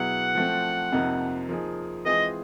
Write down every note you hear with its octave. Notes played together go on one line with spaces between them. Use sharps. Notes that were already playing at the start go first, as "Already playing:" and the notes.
Already playing: B2 F#3 B3 E4 G#4 F#5
F3 A3 C4
F2 C3 F3 A#3 D#4
F3 A#3 D#4 G#4
E3 G#3 C4 F4 G#4 D#5